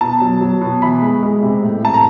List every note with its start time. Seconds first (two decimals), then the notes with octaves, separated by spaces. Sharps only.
0.01 B2 A5
0.21 F#3
0.41 F#3
0.61 B2
0.82 E3 B5
1.02 G#3
1.23 G#3
1.43 C3
1.63 A2
1.82 A2 A5
1.94 A#5